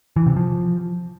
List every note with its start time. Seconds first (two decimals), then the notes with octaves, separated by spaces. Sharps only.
0.16 E3
0.26 C3
0.36 F3